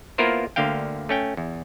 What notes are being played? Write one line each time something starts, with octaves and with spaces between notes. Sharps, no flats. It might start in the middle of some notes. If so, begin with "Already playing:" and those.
A#3 B3 E4 F4 A#4 C5
D2 D3 A#3 F5 G5
A3 C#4 G5
E2